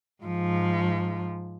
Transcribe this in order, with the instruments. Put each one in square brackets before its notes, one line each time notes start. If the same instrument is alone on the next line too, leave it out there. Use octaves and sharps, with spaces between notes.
[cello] G#2 F3